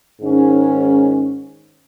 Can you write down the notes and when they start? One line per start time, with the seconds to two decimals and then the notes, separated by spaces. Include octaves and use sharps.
0.21 G#2 D#3 G#3 C#4